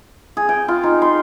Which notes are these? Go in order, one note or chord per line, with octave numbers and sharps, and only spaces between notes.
G#4
G5
F4
D#4
C6